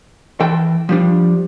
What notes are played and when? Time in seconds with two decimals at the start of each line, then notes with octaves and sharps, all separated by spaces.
0.40 E3 A4 G5
0.89 F3 G3 D4